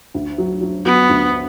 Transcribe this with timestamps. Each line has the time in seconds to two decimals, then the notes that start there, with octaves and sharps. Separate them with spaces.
0.14 D2
0.38 F#3
0.61 F#3
0.85 F#3 B3
1.09 D2